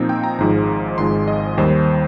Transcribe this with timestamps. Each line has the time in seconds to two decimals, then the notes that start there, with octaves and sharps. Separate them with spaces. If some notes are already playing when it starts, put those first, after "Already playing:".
Already playing: A#2 F3 C4 D#4
0.09 G5
0.24 A#5
0.38 G#1 G#2 F3 G#3 A#5
0.98 G#1 G#2 F3 G#3 C6
1.28 D#5
1.57 D#2 D#3 G3 C5